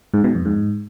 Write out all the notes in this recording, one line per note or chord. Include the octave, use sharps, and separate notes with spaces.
G#2
B2
F2
G#2